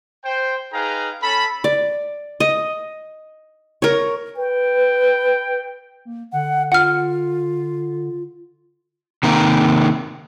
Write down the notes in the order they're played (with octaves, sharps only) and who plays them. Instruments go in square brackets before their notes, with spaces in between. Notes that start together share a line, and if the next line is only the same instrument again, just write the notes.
[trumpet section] C5 G5
D#4 G#4 B4 F5 G5 A#5
C#4 A4 A5 B5
[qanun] D5
D#5
A#4 C#5
[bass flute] B4 [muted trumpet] G5
[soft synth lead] A#3
[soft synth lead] D3 [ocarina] F#5
[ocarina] F4 [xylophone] F#5 F6
[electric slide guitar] C3 D#3 A#3